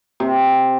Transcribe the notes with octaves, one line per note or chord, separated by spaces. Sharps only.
C3